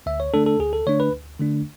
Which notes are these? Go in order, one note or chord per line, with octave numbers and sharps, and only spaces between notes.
D2 E5
C#5
D3 A3 D4 A4
A4
D2 G#4
A4
D3 A3 D4 C#5
B4
D2
D3 A3 D4